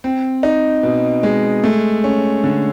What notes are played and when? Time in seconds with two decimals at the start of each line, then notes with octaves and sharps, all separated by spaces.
0.04 C4
0.43 D#4
0.83 B2
1.23 G#3
1.64 A3
2.04 C#4
2.44 D3